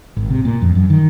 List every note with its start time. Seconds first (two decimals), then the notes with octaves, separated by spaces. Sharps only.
0.17 G#1
0.30 C3
0.45 A#2
0.62 F2
0.75 F#2
0.90 D#3